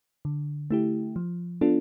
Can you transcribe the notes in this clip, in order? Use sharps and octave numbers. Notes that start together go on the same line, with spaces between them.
D3
A3 E4 G4
F3
B3 D4 F4 A4